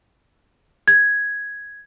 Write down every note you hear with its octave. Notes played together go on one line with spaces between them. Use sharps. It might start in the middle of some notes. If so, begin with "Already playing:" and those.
G#6